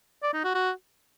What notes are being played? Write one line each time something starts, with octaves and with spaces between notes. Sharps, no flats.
D5
D#4
F#4
F#4